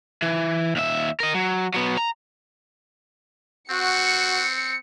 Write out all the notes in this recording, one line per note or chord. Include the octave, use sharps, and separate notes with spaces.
E3
D#2 E5
A#4 D#5
F#3
F#3 B3
A#5
C4 F#4 C#7